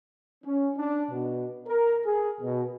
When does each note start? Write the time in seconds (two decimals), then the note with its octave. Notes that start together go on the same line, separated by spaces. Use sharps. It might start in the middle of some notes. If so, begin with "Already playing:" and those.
0.44 C#4
0.77 D4
1.11 B2
1.67 A#4
2.06 G#4
2.41 B2